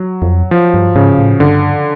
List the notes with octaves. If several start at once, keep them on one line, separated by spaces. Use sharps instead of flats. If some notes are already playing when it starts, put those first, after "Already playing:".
Already playing: F#3
F2
F3
G2
G#2 C#3
A2
G2 D3